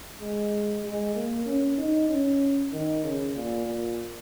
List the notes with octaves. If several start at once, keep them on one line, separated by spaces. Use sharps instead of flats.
G#3
G#3
A#3
C#4
D#4
C#4
D#3
C#3
A#2
A#2